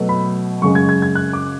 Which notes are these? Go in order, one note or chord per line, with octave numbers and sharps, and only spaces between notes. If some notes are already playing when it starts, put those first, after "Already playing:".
Already playing: B2 F#3 A3
B5
F#2 C#3 G#3 C#6
G#6
G#6
G#6
F#6
D6